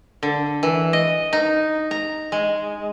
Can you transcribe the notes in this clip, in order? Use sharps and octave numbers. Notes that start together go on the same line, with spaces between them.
D3
E3
D#5
D#4
A#5
G#3